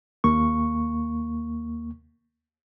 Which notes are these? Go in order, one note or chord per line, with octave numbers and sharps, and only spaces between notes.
D#2 A#3 C#6